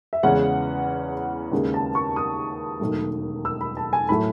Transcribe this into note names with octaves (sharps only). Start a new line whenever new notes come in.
E5
E2 C#3 E3 G#3 C#4 F#5
D#2 C#3 G#3
A5
C#6
D#6
E1 D#2 D#3 F#3 A3
E6
B5
A5
G#5
A2 F#3 A3 B5